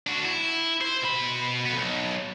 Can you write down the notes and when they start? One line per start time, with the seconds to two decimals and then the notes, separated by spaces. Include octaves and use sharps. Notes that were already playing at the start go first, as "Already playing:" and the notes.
0.07 D4 F#4
0.25 E4
0.81 C5
1.02 B2 B5
1.65 F2 B3
1.78 B1